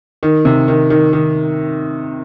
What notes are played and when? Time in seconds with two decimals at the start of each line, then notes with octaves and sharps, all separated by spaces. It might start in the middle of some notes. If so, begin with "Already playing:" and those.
0.23 D#3
0.45 C3
0.68 D#3
0.90 D#3
1.13 D#3